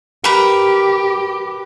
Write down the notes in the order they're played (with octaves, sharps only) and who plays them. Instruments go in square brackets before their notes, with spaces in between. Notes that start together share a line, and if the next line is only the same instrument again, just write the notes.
[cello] G4 [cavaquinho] A#4 B4